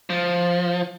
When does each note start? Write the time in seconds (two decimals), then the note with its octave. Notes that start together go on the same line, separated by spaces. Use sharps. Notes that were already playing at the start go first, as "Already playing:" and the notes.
0.10 F3